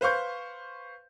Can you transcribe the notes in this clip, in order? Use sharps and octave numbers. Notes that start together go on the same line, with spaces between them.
B4 C5 F5 C#6 G6